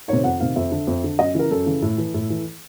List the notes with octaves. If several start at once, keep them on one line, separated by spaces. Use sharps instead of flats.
C3 D#3 C#5
F2 F#5
C3 D#3 F5
F2 E5
D3
F2
D3
F#2 D#5
C#3 E3 A#4
F#2 A4
C#3 E3
A2
E3
A2
E3